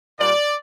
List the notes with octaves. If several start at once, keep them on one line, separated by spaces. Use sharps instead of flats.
A#2 G3 A#3 D5